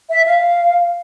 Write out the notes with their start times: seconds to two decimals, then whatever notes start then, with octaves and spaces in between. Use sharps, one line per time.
0.10 E5
0.26 F5